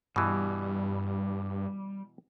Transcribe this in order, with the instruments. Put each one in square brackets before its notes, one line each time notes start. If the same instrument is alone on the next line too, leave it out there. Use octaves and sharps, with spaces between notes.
[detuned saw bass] G2 [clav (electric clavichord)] B2 E3 [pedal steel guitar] G3